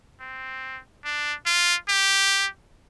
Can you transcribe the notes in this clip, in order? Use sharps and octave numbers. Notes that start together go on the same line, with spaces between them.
C4
D4
F4
G4